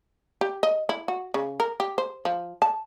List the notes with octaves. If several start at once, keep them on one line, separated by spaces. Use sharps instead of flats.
G4
D#5
E4
F#4
C#3
A#4
G4
C5
F3
A5